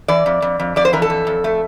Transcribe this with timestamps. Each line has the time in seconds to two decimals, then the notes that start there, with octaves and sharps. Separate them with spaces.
0.08 E3 D5
0.26 F2
0.42 F2
0.59 F2
0.76 F2 D5
0.85 C5
0.93 E3 A#4
1.02 A4
1.10 F2
1.27 F2
1.44 A3